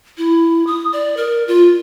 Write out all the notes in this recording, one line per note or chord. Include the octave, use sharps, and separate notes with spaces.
E4
D#6
D5
A#4
F4